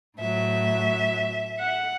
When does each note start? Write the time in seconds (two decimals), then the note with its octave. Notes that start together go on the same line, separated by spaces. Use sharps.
0.19 A2 F#3 E5
1.59 F#5